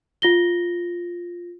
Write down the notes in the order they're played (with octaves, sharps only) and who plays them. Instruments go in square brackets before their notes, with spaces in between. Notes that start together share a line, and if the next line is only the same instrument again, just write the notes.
[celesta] F4 A#6 G7